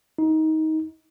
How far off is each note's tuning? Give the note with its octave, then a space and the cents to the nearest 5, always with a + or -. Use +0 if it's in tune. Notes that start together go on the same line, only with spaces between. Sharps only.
D#4 +20